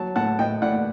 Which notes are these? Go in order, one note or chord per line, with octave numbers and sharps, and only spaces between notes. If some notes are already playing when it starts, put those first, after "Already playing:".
Already playing: F#3 A5
A2 F#5 A5
A2 D#5 G5
A2 D5 F#5